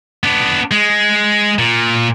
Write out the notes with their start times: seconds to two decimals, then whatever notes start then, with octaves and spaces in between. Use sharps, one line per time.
0.23 B3 D4
0.71 G#3
1.59 A#2